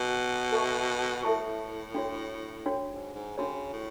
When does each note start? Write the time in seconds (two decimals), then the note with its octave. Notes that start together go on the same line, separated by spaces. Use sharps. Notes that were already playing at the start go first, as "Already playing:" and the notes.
Already playing: B2
0.52 A4 E5 A5 C#6
1.23 A2 A4 E5 A5 C#6
1.95 D4 F#4 C#5
2.66 D4 F#4 C#5
2.90 G#2
3.14 G#2
3.38 C#3 D4 F#4 C#5
3.73 A2